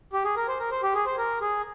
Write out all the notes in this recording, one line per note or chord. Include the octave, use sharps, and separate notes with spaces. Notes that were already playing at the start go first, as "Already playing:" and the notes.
G4
G#4
A#4
C5
A#4
C5
G4
G#4
C5
A#4
G#4